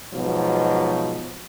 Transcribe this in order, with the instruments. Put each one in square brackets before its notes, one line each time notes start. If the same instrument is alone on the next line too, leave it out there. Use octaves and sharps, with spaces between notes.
[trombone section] G#2 B2 F3 F#3